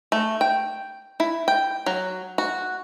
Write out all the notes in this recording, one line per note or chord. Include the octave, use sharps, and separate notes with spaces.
A3
G5
E4
G5
F#3
F#4